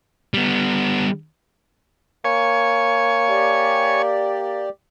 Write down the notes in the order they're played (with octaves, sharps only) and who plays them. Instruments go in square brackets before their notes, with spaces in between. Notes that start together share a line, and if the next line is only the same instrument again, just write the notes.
[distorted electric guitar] G3 B3
[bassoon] A#3 [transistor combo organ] C#5 G#5
[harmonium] G4 D5